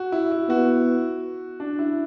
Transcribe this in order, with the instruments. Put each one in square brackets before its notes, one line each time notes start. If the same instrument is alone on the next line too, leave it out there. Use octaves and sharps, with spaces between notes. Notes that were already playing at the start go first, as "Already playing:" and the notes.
Already playing: [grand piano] F#4
E4
E4
[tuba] B3 [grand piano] F#4
[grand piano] D4
E4